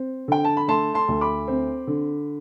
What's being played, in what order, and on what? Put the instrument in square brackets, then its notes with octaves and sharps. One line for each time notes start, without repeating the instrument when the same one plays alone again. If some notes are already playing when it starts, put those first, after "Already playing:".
Already playing: [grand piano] C4
D3 G5
A5
B5
A3 A5 C6
A5 C6
D2
B5 D6
C4
D3